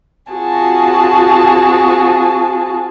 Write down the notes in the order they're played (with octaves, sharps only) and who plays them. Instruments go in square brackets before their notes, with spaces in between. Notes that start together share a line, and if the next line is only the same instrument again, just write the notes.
[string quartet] C4 F4 F#4 G#4 A5